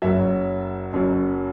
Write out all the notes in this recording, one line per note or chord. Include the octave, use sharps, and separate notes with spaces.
F#1 F#2 F#3 E5
F#1 F#2 F#3